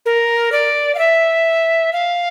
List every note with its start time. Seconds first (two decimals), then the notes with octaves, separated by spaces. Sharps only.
0.06 A#4
0.52 D5
0.95 F5
0.99 E5
1.93 F5